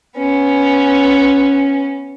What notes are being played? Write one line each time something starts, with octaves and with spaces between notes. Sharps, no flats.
B3 C#4